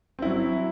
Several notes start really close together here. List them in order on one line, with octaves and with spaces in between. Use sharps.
C4 E4 F#3